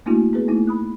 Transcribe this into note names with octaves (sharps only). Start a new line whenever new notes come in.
A3 A#3 D4 E4 F#4
B3 G#4 B4
A3 A#3 D#4 E4
B5 D#6 F#6